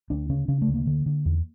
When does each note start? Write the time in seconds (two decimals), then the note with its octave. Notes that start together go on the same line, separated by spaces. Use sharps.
0.10 D2 D4
0.29 C#3 C#4
0.48 C#3 C#4
0.62 A3
0.68 D2
0.74 A#3
0.87 D3
1.06 D3
1.25 E2